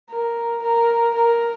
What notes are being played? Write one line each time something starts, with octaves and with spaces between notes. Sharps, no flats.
A#4
A#4
A#4